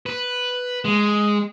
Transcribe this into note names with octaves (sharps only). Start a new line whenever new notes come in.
B4
G#3